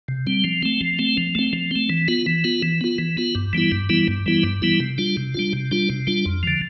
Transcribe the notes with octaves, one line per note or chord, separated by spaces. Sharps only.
C3
G3 C4
F3
A3 C4
F3
A3 C4
F3
A3 C4
F3
A3 C4
E3
B3 F4
E3
B3 F4
E3
B3 F4
E3
B3 F4
G2
E3 G3 B3 E4
G2
E3 G3 B3 E4
G2
E3 G3 B3 E4
G2
E3 G3 B3 E4
C3
G3 D4 F4
C3
G3 D4 F4
C3
G3 D4 F4
C3
G3 D4 F4
F2
D3 F3